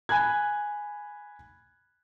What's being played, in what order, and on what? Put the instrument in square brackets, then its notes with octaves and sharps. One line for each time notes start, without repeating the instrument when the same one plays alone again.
[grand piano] G#5 B5 F#6 G#6